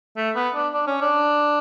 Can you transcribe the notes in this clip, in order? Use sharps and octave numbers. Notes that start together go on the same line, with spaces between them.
A3
B3
D4
D4
C#4
D4